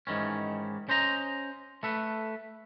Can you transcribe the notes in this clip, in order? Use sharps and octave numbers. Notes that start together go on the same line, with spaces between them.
G#2 D#3 E3 C#4
C#4 C5 D#5 A#5
A3 A4 B4